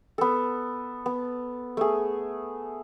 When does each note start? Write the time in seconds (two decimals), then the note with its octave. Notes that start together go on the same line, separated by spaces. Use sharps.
0.18 B3 A4
1.06 B3
1.77 A3 G#4